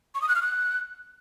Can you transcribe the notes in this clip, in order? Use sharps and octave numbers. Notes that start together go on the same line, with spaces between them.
C#6
D#6
F#6
F6
F#6